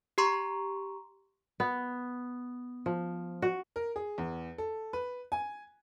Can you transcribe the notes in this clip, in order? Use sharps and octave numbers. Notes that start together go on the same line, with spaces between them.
G4 A#5 C6 C#6
B3
F3
F#4
A#4
G#4
E2
A4
B4
G#5